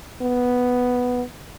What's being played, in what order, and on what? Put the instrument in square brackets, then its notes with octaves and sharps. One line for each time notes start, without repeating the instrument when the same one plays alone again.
[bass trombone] B3